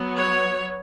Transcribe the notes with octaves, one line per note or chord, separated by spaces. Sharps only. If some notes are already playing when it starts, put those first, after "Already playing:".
Already playing: F#3 B3
C#5